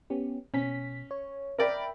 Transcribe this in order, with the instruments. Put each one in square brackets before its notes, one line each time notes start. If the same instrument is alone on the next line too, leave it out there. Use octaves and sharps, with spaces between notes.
[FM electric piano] B3 C#4 G4
[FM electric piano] B2 B6 [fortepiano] C#4
[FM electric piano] C#5
[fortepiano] A#4 D5 [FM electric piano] E5 G5 B5